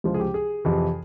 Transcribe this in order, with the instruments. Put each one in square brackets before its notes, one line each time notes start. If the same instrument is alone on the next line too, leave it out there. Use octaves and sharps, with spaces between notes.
[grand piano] C#2 C3 F3 F4
G#4
G4
G#4
F2 C3 E3